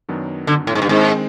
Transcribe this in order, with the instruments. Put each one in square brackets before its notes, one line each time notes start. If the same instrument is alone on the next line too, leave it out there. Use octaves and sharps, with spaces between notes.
[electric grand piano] F#2 D#3 F#3 B3 D4
[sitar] D3
A2
G#2
G2
[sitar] G#2 [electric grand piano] D#3 G#3 C4